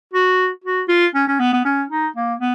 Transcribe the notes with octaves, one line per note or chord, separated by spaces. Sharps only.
F#4
F#4
F4
C#4
C#4
B3
B3
C#4
D#4
A#3
B3